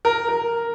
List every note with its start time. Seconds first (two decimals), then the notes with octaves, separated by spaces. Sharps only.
0.05 A#4
0.29 A#4